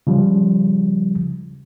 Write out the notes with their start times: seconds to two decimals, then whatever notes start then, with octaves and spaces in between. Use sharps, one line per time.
0.07 C#3 F3 G3